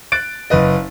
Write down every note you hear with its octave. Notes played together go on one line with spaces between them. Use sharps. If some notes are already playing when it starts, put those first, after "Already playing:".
F#6 A6 D7
F#1 B4 D#5